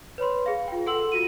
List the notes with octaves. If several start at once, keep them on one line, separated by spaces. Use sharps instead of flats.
B4 C#5 B5 C6
G#4 F5
F4 G5
A4 F#5 C6 E6 F#7
F4 F#4 D#7